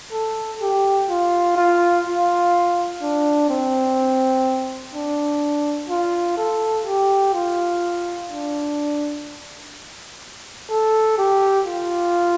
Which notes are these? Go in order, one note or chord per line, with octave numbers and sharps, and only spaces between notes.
A4
G4
F4
F4
F4
D4
C4
D4
F4
A4
G4
F4
D4
A4
G4
F4